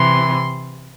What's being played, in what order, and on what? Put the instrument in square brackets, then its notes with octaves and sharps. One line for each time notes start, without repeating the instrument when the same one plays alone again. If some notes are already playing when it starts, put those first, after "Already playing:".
Already playing: [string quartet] C3 E3 [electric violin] C6